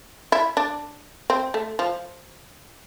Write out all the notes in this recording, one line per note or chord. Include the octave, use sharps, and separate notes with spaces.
E4
D4
C4
A3
F3